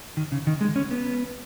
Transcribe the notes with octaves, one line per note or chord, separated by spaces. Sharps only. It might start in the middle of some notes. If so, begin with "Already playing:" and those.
D#3
C#3
D#3
G#3
C#4
B3